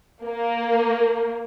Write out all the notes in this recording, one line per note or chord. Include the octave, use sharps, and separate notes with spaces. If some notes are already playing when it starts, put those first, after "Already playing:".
A#3